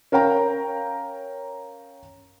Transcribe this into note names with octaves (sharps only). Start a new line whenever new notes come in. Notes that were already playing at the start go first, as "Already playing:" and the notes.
C#4 A#4 F5 G5 A#5